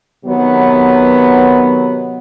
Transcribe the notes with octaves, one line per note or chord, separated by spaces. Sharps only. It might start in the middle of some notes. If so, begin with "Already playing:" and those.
C3 D#3 F#3 B3